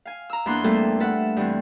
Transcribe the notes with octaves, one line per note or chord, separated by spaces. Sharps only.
F5 G#5
A#5 E6
E2 A#3 D4 B5 C6 F#6
G3 A3 A#3 C4 A4 C5
F4 A4 B4 E5 F#5
G2 E3 C4